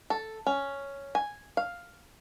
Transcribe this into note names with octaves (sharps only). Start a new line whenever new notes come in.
A4
C#4
G#5
F5